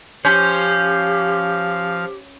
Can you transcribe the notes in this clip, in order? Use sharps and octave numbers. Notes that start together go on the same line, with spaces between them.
F3 C#4 G4 C5 F5